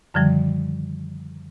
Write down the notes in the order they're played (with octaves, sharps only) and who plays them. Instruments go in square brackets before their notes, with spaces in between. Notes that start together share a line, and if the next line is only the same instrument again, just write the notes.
[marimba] F#2 D3 D#3 F3 G3